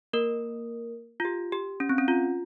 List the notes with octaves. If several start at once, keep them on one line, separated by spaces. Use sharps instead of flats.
A#3 A#4
F4
G4
G4
C#4
C4
C#4
F4